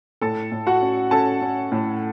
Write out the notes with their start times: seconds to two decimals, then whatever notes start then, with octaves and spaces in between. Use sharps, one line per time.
0.21 A2 A4 A5
0.52 A2
0.67 F#4 F#5
0.82 C#4
1.11 C#4 A4 A5
1.42 C#4
1.72 A2